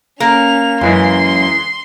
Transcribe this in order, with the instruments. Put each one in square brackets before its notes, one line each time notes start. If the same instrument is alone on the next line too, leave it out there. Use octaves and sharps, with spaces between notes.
[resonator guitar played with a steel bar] A#3 [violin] C#4 F7
[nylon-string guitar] F#2 [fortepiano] C#3 E3 G#3 [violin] C6